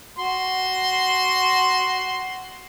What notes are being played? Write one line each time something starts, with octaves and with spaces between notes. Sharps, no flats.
F#4 C6